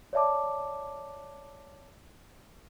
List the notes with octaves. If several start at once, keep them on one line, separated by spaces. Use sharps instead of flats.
C#5 D5 E5 A5 D6